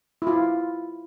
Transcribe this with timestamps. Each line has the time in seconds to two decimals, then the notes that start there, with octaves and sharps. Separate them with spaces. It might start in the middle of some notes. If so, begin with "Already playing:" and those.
0.22 E4
0.27 F4